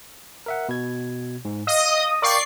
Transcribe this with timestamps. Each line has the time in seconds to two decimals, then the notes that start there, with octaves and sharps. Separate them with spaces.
0.46 A#4 E5 F#5
0.69 B2 G#6
1.45 G#2
1.67 D#5 F5 D#6
2.22 A#4 D5 F5 G5 C#6 C7